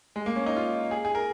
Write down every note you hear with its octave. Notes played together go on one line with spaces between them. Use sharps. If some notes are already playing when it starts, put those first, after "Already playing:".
G#3
A#3
C#4
D#4
F4
G#4
G#4
A#4